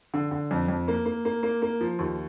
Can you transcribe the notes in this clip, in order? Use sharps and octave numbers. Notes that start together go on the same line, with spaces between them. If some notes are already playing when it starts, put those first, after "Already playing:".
D3
D3
F2
F2
A#3
A#3
A#3
A#3
A#3
F3
D#2